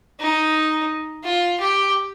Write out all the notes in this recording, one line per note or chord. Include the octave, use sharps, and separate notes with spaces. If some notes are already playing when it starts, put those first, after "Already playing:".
D#4
F4
G4